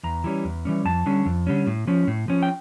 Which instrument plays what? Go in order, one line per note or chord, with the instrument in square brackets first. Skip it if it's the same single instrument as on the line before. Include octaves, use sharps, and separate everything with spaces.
[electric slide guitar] E2 A#5
E3 G3 C#4
E2
E3 G3 C#4
F2 A5
D3 G3 C#4
F2
D3 G3 C#4
A2
F3 C#4
A2
F3 C#4
G5